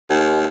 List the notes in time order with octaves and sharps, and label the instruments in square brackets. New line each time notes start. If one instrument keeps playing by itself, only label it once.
[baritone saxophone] D#2